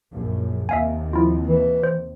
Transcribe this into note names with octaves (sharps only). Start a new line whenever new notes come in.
A#1 F#2
D#2 C3 E5 F5 G#5
F3 E4 F4
E3
C5